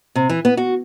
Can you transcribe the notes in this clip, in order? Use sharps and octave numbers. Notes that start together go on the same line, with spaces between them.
C3
E3
B3
F#4